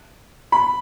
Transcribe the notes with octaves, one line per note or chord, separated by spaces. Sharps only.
B5